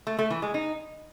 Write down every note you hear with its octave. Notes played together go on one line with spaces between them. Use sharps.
A3
A3
E3
G#3
D#4